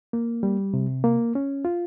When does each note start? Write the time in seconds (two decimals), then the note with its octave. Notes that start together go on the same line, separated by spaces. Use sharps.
0.13 A#3
0.43 G3
0.74 C3
1.04 A#3
1.35 C#4
1.65 F4